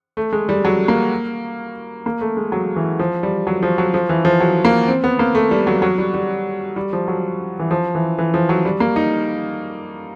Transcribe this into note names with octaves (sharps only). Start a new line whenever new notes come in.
A3
G#3
G3
F#3
A#3
A#3
A3
G#3
F#3
E3
F3
G3
F#3
F3
F#3
F3
E3
F3
F#3
A#3
C4
B3
A#3
A3
G3
F#3
F#3
G3
G3
G3
F3
F#3
E3
F3
E3
E3
F3
F#3
G3
A#3
D#4